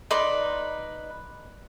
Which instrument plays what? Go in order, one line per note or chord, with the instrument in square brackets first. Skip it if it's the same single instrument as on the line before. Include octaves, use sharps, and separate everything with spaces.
[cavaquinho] D#4 B4 D5 C6